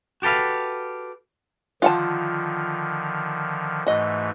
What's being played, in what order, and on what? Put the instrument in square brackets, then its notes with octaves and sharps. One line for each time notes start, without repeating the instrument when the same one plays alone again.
[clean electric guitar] F#4 G4 A4 B4 F5
[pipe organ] D3 D#3 F3 [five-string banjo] F4 F#5 A5
[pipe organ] G#2 E3 A3 [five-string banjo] F#4 D#5